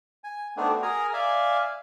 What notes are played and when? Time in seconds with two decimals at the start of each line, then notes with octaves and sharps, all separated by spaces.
0.24 G#5
0.57 A3 B3 C4 D4 D#4
0.69 F#4
0.82 G#4 A#4 G#5 A#5
1.13 D5 E5 F5 G#5